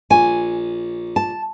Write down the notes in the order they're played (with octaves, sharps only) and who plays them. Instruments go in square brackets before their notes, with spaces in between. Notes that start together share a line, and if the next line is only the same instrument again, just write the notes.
[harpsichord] A#1 [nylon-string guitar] G#5
[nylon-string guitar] A5